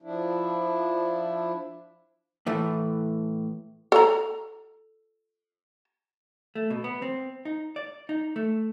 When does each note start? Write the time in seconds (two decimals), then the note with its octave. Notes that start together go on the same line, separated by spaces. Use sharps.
0.02 F3 D4 E4
2.46 A2 E3 A3
3.92 A4 A#5
6.55 A3
6.70 B2
6.84 B3
7.02 C4
7.45 D#4
7.76 D5
8.09 D#4
8.36 A3